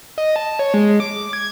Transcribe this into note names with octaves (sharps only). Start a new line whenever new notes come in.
D#5
A5
C#5
G#3
D6
G#6